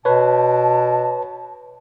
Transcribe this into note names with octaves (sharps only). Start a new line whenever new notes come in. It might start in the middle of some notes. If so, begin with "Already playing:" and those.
B2 B4 C#5 A5